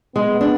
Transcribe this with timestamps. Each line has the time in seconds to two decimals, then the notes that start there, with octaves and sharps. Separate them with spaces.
0.15 G#3 B3
0.41 D4